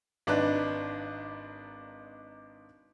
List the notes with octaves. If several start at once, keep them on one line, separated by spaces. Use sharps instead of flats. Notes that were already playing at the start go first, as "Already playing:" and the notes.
G#1 D4 D#4 B4 F#6